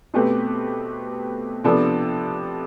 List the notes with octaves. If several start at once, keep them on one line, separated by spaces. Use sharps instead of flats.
B2 A3 C4 G4 B4
C3 F3 B3 D4 A4